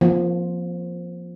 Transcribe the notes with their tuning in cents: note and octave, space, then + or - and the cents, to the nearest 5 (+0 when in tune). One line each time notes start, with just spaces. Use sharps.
F3 +0 A#3 +35